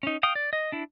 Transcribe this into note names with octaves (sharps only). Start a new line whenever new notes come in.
C#4 D#4
F5 G5 D#6
D5
D#5
D4 E4